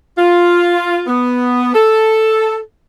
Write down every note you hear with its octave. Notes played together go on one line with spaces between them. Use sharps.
F4
B3
A4